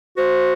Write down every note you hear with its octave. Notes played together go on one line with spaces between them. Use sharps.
F#4 C5